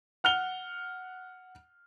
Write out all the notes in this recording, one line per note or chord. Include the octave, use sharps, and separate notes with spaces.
F#5 F6 F7 G7